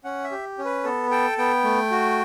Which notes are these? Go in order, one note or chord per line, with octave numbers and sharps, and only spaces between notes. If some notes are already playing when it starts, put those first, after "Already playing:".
C#4 F#5
E5
G4
C#4
B4
B3 A4
A4 G5
B3 G5
A3
F#4